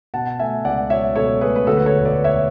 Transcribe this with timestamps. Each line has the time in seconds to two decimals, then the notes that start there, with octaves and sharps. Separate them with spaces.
0.14 B2 F#5 A5
0.39 A3 E5 G#5
0.65 C#2 D5 F#5
0.90 F#3 C#5 E5
1.16 B2 A4 C#5
1.41 A3 G#4 B4
1.56 B4
1.67 D2 F#4 A4
1.77 B4
1.86 A4 C#5
1.93 E1
2.05 B4 D5
2.18 E1
2.24 C#5 E5